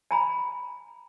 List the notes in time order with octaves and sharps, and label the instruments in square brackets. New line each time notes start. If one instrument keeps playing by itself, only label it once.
[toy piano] G#5 A#5 B5